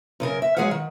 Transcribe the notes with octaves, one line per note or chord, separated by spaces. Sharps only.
F#2 C#3 A#4
E5
F#3 G#3 G#4 C#5 F5 F#5
D#3